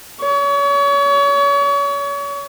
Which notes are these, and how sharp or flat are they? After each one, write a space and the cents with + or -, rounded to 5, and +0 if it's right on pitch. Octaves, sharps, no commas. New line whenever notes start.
C#5 +35